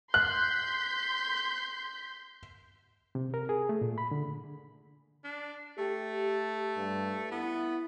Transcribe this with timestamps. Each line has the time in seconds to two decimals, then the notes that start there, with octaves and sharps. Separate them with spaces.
0.14 C6 F#6 G6 B6
3.15 C3
3.34 A#4
3.49 G#4
3.69 A3
3.81 A#2
3.98 B5
4.11 D3
5.24 D4
5.78 A3 G4
6.22 G4
6.77 G2
7.31 B3 E4